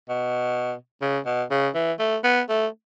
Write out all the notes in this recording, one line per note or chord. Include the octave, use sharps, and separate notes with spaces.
B2
C#3
B2
C#3
E3
A3
B3
A3